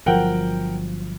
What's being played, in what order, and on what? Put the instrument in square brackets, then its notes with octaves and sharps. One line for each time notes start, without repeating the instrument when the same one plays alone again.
[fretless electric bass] G1 F3 F#3 [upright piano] A#4 F#5 G5